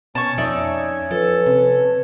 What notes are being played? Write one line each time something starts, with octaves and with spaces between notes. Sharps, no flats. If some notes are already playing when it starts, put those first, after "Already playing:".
B2 C#4 C#5 A5 C#6
F2 D#4 D5 E5
F3 A4 B4
C3